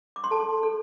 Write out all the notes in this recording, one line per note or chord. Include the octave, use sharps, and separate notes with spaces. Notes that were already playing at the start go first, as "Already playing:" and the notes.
D6
C6
A4 A5
A4